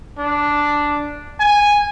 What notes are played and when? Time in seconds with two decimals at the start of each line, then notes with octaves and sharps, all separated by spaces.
0.18 D4
1.40 G#5